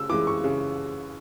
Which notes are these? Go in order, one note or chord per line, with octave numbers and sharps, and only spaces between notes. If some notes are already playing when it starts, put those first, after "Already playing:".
Already playing: C#3 E6
E3 G#3 D6
C#6
C#3